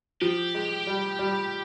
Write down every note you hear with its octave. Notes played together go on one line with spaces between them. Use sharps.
F3 G4
G#3
G3
G3